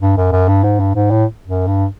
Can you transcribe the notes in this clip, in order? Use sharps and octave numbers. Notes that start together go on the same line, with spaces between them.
G2
F#2
F#2
G2
G#2
G2
G#2
A2
F#2
G2